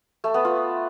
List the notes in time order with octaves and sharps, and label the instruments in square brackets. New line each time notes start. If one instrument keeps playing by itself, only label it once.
[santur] A3
B3
F4